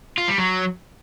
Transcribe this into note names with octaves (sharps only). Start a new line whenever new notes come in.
F4
G3
F#3